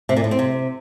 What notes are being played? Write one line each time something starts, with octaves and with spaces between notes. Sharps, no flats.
C3
A#2
A2
C4
C3